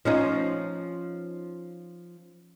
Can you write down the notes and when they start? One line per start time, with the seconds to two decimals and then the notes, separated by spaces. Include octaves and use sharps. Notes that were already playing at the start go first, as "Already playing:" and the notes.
0.05 F3 C#4 D#4